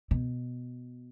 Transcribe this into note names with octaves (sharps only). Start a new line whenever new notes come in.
B2